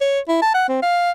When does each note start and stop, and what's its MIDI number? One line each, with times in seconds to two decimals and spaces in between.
0.01 0.20 73
0.28 0.39 64
0.42 0.51 81
0.54 0.65 78
0.68 0.79 60
0.83 1.11 77